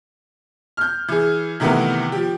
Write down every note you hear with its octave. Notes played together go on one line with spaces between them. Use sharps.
F6 G6
E3 G#4
C3 D#3 E3 A3 B3 A#4
F3 G4